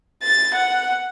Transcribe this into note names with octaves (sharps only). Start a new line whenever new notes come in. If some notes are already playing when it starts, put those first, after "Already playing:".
A6
F#5